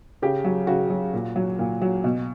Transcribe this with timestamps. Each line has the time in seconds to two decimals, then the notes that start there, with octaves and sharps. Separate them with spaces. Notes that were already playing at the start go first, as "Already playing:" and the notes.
0.22 C#3 G4
0.44 F#3
0.67 C#3 F#4
0.90 F#3
1.14 A#2
1.36 F#3
1.59 A#2
1.82 F#3
2.04 B2